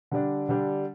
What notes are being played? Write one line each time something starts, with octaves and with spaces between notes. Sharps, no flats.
D3 G3 D4
D3 G3 D4